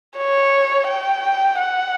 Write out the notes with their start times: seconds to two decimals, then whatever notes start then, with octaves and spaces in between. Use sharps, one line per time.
0.17 C#5
0.88 G5
1.58 F#5